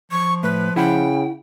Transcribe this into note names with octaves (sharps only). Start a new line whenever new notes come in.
F3 C#6
A2 B4
C#3 E4 F#5 G5 B5